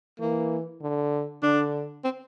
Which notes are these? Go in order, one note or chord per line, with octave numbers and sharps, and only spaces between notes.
E3 A#3
D3
D3 D4
C4